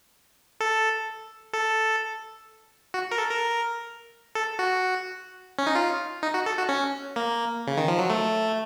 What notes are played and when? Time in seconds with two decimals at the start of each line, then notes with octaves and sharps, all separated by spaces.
0.60 A4
1.53 A4
2.94 F#4
3.12 A#4
3.18 A4
3.30 A#4
4.35 A4
4.59 F#4
5.59 C#4
5.67 D#4
5.75 F4
6.23 D#4
6.34 F#4
6.46 A4
6.57 F#4
6.69 C#4
7.16 A#3
7.67 C#3
7.77 D#3
7.88 F3
7.98 F#3
8.10 A3